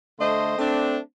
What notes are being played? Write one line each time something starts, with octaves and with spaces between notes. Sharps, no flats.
D3 A3 C5 D#5 C6
A3 C4 D4